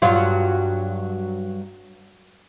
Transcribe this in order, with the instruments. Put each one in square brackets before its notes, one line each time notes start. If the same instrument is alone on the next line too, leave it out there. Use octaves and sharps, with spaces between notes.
[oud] G2 F#3 F4